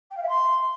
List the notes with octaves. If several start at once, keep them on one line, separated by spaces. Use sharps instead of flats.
G5
F5
E5
C6